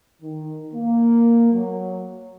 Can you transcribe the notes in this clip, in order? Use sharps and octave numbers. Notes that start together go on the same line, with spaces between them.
D#3
A#3
F#3